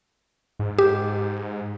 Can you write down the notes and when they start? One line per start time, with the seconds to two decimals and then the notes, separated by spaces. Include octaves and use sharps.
0.59 G#2
0.79 G4